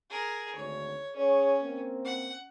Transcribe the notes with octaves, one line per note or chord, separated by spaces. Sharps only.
G#4 A#4
G#1 D2 C#5
C#4 G#4 C#5
A#3 C4
F#5